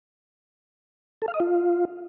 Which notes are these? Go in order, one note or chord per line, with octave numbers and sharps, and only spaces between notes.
A4
F5
D#5
F4